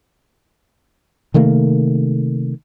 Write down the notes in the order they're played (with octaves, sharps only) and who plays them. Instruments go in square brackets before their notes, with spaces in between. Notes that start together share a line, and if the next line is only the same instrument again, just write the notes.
[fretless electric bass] C3 D#3 A3 A#3